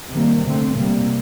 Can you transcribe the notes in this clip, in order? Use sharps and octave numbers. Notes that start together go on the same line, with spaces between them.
C3 D#3 G3 A#3
D3 A3 C4
C3 G3 A#3